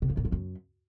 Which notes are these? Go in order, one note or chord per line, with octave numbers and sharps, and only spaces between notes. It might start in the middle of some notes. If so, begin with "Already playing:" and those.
C3
F3
A#2
F3
F#2